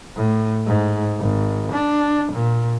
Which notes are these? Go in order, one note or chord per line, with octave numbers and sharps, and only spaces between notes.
A2
G#2
G#1
D4
A#2